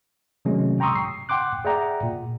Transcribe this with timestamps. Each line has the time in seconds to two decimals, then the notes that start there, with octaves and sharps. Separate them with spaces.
0.45 C3 D#3 F#3 G#3 A3 C#4
0.80 G5 A#5 C6 C#6 D#6 E6
0.95 C7
1.29 F#5 G5 C6 D6 F#6
1.65 G#4 D5 E5 F#5 G5 A#5
2.03 A#2